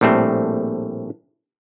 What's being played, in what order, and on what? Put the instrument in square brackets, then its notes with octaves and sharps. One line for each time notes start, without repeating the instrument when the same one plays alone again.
[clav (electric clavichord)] A#1 A2 G3 A3 C4